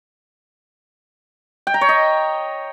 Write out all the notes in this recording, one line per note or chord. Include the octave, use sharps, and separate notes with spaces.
G5
A#5
C#5
D#5